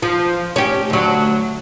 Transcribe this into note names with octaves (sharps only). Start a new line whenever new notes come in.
F3
C#4 G4
D2 F#3